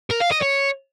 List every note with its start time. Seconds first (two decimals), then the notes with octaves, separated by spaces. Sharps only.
0.11 A#4
0.21 F5
0.32 D#5
0.42 C#5